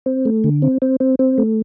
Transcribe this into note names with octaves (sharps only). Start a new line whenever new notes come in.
C4
A3
D3
C4
C4
C4
C4
A3